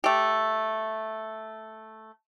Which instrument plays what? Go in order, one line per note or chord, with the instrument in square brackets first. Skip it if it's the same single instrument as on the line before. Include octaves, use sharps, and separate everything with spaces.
[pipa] A3 G4